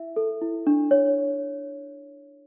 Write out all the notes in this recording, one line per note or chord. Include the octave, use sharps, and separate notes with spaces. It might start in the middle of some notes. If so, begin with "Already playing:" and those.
Already playing: E4 E5
A4
E4
D4
C#5